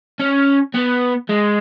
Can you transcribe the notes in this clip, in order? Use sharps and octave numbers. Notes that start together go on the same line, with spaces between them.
C#4
B3
G#3